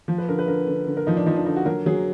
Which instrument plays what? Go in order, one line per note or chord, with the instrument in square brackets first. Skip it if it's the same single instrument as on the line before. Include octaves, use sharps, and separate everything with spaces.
[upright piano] F3
B4
D3 A#4
B4
D3 A#4
D3
D3
A#4
F3 D#4
D4
F3 D#4
D4
D3 D#4
F#4
F#3 A#4
F#3 G#4